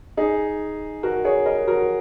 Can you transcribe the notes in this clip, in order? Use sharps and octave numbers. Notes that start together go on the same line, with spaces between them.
D#4 G#4
F#4 A#4
G#4 C#5
A#4 D#5
F#4 A#4